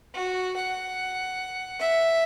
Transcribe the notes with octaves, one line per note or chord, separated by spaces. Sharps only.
F#4
F#5
E5